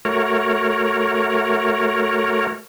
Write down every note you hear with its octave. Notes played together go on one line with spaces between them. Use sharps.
A3 F#4 A#4 C#5